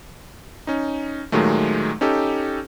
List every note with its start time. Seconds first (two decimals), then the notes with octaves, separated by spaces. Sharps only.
0.67 C#4 D#4
1.32 A#2 D#3 F#3 G#3 A3
2.01 C#4 D#4 G4 A4